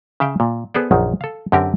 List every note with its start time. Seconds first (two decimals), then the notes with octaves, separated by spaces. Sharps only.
0.20 C#3 E5 F5 G5
0.40 A#2
0.74 B3 G#4 A4 C5 D5
0.91 A#1 F#2 D#3
1.21 A4 F5
1.52 F#2 D3 C4 G4 A#4